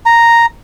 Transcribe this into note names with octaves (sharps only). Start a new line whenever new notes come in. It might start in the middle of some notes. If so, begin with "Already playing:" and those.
A#5